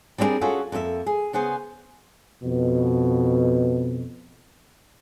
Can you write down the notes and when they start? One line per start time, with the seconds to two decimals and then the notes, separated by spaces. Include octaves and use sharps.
0.18 G3 C4 D4 E4 G#4 A#4
0.41 C#4 F4 F#4 G#4 A4
0.72 F2 A#3 G4 E5
1.06 G#4
1.33 C#3 B3 G#4 C5
2.43 F2 B2